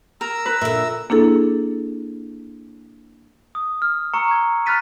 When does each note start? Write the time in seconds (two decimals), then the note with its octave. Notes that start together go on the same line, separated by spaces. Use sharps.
0.21 A#4 A#5 E6
0.46 B4
0.61 A#2 D3 E5
1.10 A#3 D4 E4 G#4 A4
3.55 D#6
3.82 F6
4.14 A#5 C#6 E6 C#7
4.28 C#6 G#6
4.66 B5 F6 F#6 A6 B6 D#7